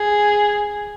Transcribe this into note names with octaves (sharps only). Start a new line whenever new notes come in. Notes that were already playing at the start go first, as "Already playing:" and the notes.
Already playing: G#4